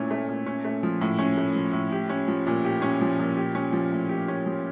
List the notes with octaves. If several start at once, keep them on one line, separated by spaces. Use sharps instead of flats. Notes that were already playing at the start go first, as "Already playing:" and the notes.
Already playing: A#2 A3 C#4 E4
A3
A#2
C#4
A3
F3
A2
C#4
A3
F3
A2
G4
C#4
F3
A#2
G4
C#4
F3
A#2
G4
C#4
F3
A2
G4
C#4
F3